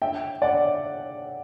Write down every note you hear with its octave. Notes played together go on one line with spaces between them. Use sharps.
E5 G5
D5 F#5